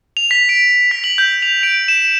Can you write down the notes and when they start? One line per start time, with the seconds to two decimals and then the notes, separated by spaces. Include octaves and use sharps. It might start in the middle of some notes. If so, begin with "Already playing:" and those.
0.17 F7
0.31 B6
0.49 D7
0.91 B6
1.04 F#7
1.18 G6
1.42 F7
1.63 D7
1.88 E7